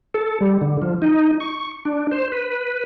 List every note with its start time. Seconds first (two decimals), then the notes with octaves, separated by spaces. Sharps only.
0.14 A4
0.41 G3
0.61 D3
0.82 F3
1.02 D#4
1.40 C#6
1.85 D4
2.12 C5
2.32 B4